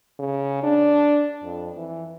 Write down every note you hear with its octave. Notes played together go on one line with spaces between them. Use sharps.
C#3
D4
F2
E3